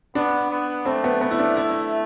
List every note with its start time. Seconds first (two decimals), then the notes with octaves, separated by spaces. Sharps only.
0.15 B3 D4
0.51 B3
0.86 A3 C4
1.04 B3
1.21 B3
1.31 E4
1.39 D4
1.57 E4